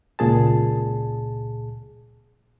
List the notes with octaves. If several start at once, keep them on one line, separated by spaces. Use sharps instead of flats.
C#2 A#2 G#4 A5